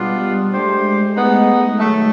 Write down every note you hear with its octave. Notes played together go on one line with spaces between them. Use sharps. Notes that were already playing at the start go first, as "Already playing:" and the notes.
Already playing: B2 G3 G#3 B3 D4 F4
G#3 A3 D4 G4 C5
G#3 A3 B3 D#4
D#3 F#3 A3